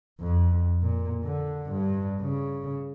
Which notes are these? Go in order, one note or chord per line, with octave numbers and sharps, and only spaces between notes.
F2
A#2
D3
G2
C#3